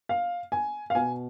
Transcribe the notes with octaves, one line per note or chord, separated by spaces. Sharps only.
F5
G#5
F5
B2 G#5